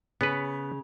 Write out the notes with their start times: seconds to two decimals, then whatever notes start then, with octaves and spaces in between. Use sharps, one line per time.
0.21 C#3 B3 B4